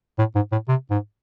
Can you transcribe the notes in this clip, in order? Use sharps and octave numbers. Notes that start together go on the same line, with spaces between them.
A2
G#2
A2
C3
G#2